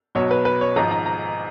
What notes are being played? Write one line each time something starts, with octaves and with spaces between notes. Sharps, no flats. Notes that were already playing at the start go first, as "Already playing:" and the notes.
B1 B2 F#3 C#5
B4
B4
C#5
G#1 G#2 F3 A#5
A#5
A#5